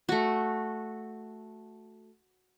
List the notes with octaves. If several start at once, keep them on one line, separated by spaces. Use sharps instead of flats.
A3 F#4